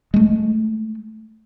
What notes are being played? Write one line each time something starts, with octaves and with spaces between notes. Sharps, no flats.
G#3 A3